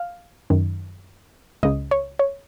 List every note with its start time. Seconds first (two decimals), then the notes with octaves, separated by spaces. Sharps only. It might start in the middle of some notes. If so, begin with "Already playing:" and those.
Already playing: F5
0.50 F#2 D#3
1.63 C#2 C#3 D#5
1.91 C#5
2.19 C#5